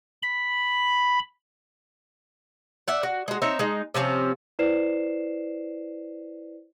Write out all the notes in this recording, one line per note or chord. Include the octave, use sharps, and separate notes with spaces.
B5
D5 E5 F#5
F#4
G#3 F#4
C4 D#4 C#5 E5
G#3 D#4
C3 F3 C4 C#4
E4 B4 C5 D5 C7 E7